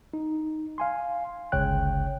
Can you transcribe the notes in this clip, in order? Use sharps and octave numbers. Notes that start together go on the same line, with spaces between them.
D#4
F5 G#5 C6
G1 C#2 C#3 C#5 G5 F#6